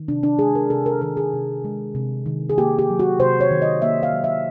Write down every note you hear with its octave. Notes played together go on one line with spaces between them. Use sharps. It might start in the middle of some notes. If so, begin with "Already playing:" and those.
Already playing: D#3
C3 D4
D4
G#3 G#4
A#4
C3 A4
A#4
D#3 A#4
G#4
C3
G#3
C3
D#3
G#4
A#3 G4
G4
F#3
F#4
C3 C5
C#5
D#3
D#5
A#3 E5
F5
F#3
E5